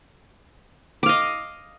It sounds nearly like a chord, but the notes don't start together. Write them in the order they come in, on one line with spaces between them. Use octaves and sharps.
D6 F5 D#5